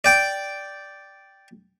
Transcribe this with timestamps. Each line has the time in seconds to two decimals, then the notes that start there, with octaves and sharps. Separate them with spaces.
0.04 D5 G5 D6